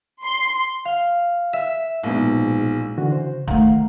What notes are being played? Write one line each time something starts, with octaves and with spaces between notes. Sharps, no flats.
C6
F5
E5
A#1 G#2 B2
D3 E3 F#4
C#3 C5
D#3 A3 F5 F#5 A#5